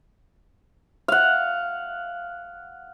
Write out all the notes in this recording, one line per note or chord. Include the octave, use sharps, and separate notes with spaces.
F5 F#5